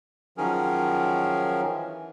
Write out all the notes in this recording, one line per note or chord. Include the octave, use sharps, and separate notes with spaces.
D#3 F3 F#3 C#4 G#4 A#4
E3